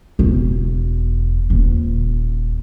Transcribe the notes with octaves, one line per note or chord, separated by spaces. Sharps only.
E1
D#1